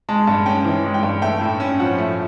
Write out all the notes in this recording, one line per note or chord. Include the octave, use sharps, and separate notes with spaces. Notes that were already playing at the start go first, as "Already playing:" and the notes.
G#3 A5
G2 A5
C#4 G5
E3
G#3
G5
G2
A3 G5
A2
C#4
F3 F#5
A3